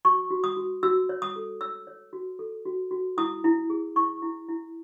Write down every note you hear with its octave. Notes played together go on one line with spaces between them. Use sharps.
F#4 C#6
F#4
D#6
F#4
F#4 E6
C#5
D#6
A4
C#5 E6
C#5
F#4
A4
F#4
F#4
E4 D#6
E4
G#4
E4 C#6
E4
E4